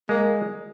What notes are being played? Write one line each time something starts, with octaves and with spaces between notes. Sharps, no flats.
G#3 A#3